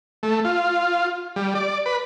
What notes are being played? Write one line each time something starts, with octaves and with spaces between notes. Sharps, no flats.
A3
F4
G3
D5
B4